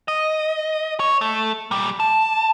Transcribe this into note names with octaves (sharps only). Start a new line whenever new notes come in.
D#5
C#5
A3
A#2 G3
A5